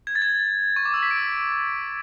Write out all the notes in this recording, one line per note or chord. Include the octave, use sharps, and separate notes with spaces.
G#6
A6
G#6
C#6
D6
E6
B6
D7